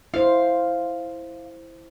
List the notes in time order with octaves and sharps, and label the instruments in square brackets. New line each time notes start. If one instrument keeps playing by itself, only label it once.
[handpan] E4 C5 [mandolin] F5